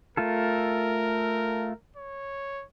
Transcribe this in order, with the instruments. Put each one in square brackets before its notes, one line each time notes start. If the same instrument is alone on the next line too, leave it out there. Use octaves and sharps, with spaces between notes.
[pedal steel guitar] A3 F4 A4 [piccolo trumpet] A#4
[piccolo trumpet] C#5